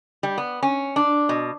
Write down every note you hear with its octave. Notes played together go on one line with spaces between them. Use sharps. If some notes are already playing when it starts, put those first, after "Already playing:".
G3
B3
C#4
D4
B2